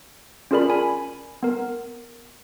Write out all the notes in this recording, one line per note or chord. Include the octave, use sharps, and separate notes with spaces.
C#4 F4 G#4 A#4 D5 B5
G#5 B5
B3 A#4